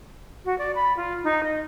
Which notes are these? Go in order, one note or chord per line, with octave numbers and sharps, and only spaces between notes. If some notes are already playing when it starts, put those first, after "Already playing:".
F#4
D5
B5
F4
D#4
D#5